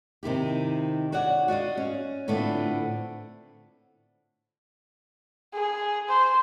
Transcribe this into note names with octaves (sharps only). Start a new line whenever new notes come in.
C3 D#3 E4 G4
F#4 C#5 D5 F#5
F#4 D5 D#5 F5
C#4
A2 D3 A3 B3 C4 F4
G#4
C5